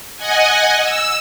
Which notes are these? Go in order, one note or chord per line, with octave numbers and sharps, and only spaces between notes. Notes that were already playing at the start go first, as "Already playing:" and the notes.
D#5 F#5 G#5
E6